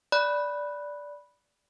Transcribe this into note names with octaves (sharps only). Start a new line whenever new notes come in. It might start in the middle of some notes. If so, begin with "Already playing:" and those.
D5 B5 F#6